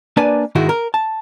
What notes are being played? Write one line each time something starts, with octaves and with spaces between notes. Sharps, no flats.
A#3 D4 B4 D5 G#5 A5
G#2 D#3 G#3 E4 F#4
A#4
A5